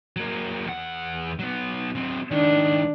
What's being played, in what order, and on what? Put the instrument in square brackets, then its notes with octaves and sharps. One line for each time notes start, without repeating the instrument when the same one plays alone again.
[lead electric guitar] F#3 A#3
E2 F#5
F#3 B3
F#3 C4
[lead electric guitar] C#2 D#3 [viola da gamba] D4